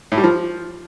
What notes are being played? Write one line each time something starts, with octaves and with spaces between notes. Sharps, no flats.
A2
G3
F3